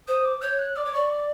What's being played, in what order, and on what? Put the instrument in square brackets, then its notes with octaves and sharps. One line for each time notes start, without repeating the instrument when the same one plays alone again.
[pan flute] C5 [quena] D#6
[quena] D6
[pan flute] C#5 [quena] G6
[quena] F#6
[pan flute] D5 [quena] D6
[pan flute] C#5
[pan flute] D5 [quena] C#6
[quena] D6